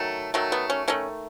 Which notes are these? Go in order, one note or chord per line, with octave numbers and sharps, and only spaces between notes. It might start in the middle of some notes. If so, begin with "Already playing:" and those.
Already playing: D#3 F#3 A3
D#3 F#3 A3
B3
C#4
D#3 A3 C#4